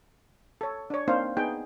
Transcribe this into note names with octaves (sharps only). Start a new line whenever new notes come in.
A4 C#5
D4 C#5
A#3 C4 D4 D#4 C5 F5
B3 D#4 G#4 G5